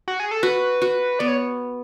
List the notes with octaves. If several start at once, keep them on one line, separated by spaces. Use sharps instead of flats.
F#4
G#4
A4
F#4 B4
F#4
B3 D5
C#5